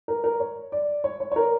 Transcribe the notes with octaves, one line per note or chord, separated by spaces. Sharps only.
A#4
A#4
C#5
D5
C#5
C#5
C#5
A#4